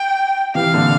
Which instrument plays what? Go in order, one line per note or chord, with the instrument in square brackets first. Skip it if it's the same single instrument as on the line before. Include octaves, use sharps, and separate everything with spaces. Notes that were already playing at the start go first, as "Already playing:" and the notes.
Already playing: [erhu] G5
[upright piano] C3 E3 [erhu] F5
[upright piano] A#2 D3